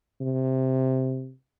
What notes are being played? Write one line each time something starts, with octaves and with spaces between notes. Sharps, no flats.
C3